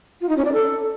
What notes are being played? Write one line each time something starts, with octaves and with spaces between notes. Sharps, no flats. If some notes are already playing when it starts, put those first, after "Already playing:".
F4
D#4
C#4
D5
A4